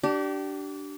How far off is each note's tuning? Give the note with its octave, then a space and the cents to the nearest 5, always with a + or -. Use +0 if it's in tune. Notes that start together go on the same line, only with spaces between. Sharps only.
D4 +0 G4 -30